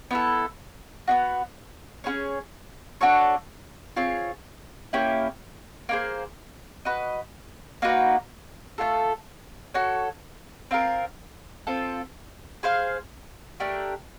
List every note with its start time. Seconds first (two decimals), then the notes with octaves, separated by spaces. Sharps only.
0.11 B3 E4 A4
1.08 B3 D4 F#4
2.04 C#4 F4 G#4 C#5
3.01 D4 F#4 A4 C#5
3.96 C4 F4 G#4 C#5
4.93 A#3 C#4 E4 G4
5.89 A#3 D#4 G#4 C5
6.85 F#4 B4 D#5
7.82 A#3 D#4 F#4 B4
8.78 A3 D4 F4 A4
9.74 F#4 A4 C#5
10.71 C4 F4 A#4
11.67 C4 F4 A4
12.63 G#4 C5 F5
13.60 A3 D4 G4 A#4